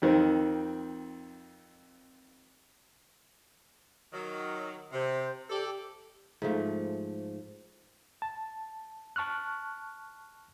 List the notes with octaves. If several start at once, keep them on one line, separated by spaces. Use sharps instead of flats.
F2 D#3 C4
D#3 F#3
C3 C5
G4 A4 D5
G#2 F3 A3
A5
A5 C#6 F6 F#6